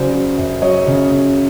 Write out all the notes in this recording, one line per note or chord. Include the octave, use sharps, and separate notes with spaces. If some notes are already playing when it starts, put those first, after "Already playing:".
Already playing: C#3 F#3 C5 D5
F#3
F#2
F#3 C#5 D#5
C#3
C#3